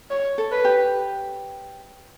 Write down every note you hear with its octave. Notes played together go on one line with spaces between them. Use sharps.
C#5
A4
B4
G4